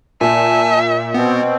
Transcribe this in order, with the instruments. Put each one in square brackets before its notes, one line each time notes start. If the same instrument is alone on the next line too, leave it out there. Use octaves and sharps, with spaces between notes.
[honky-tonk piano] A#2 [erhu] E5 [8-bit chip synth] G#5 A5
[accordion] B2 C4 [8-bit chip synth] B3